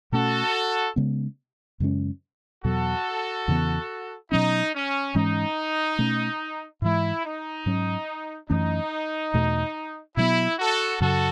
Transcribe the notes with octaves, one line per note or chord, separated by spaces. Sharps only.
B2 A3 C#4 F#4 A4
C#3 G#3 B3
F#2 C#3 G#3 C#4
E2 B2 F#3 F#4 A4
E2 C#3 E3 B3
B2 F#3 C#4 D#4
C#4
G#2 E3 G#3 C#4 D#4
B2 A3 C#4
G#2 E3 G#3 E4
D#4
G#2 F#3 C#4
F#2 E3 A3 C#4 D#4
E2 B2 A3
B2 F#3 B3 E4
F#4 A4
F#2 C#3 F#3 F#4 A4